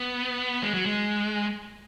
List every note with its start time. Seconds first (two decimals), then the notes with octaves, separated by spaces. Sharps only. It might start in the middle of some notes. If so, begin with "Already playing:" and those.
Already playing: B3
0.63 G#3
0.74 F#3
0.86 G#3